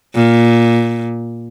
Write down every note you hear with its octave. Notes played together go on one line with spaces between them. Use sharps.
A#2